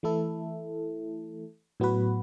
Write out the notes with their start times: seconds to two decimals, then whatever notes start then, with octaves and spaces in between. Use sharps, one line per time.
0.03 E3 A3 E4 A4
1.80 A2 F#3 B3 F#4 B4